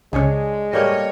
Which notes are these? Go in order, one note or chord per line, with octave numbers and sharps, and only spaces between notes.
C#2 C#3 G#3 D4 G#4 C#5
G3 A3 A#3 C#5 D#5